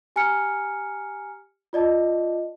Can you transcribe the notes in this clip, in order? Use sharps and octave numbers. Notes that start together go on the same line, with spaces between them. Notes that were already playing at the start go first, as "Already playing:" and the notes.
G4 G#5 A#5 F6 C#7
F4 D5 D#5 A5